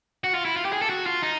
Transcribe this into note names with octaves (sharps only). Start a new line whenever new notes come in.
F#4
F4
E4
F4
G4
G#4
A4
F#4
F4
D#4